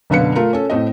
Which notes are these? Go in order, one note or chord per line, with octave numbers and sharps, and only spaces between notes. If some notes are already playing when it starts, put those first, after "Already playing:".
F#1 B2 D3 B4 F5 C#7
A3 F4 A#4
C#4 A4
A2 A3 C4 D#5